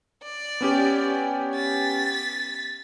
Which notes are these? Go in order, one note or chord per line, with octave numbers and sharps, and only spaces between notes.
D5
B3 C#4 G4
A6 B6